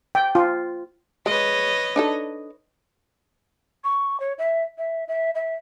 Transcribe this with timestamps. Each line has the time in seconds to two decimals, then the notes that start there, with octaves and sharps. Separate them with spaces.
0.15 G5
0.35 F4
1.26 G#3 B4 C#5 D#5
1.96 D4 D#4 A4
3.84 C#6
4.20 C#5
4.38 E5
4.78 E5
5.08 E5
5.35 E5